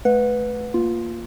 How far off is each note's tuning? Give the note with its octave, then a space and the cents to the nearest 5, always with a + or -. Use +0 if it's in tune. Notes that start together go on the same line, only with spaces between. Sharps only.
A3 -25 B4 +0 F#5 -30
A#3 -5 F4 +0